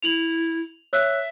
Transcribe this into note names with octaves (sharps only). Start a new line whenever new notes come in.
E4 F7 F#7
C#5 E5 E6 F#6